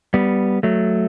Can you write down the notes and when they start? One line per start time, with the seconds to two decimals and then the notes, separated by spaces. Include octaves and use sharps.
0.14 G3 B3
0.63 F#3 A3